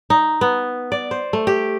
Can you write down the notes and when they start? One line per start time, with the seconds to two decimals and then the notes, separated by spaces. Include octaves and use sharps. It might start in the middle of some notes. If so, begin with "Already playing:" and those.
0.10 D#4
0.41 B3
0.92 D5
1.11 C5
1.33 A3
1.47 G4